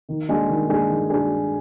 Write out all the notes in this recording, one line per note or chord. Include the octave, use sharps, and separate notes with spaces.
D#3
G#3 D4 G#4
D#3
G#3 D4 G#4
D#3
D4 G#4